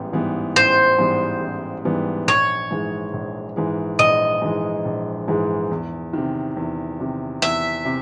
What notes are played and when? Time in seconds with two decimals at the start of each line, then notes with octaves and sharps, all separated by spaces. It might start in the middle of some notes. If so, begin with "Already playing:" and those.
Already playing: A1 G#2 E3 G3 B3
0.13 G#2 E3 G3 B3
0.56 A1 C5
0.98 G#2 E3 G3 B3
1.41 A1
1.85 G#2 E3 G3 B3
2.27 A#1 C#5
2.71 G#2 E3 G#3
3.14 A#1
3.56 G#2 E3 G#3
3.99 A#1 D#5
4.42 G#2 E3 G#3
4.85 A#1
5.28 G#2 E3 G#3
5.71 E2
6.13 C3 D#3
6.57 E2
7.00 C3 D#3
7.42 E2 E5
7.85 C3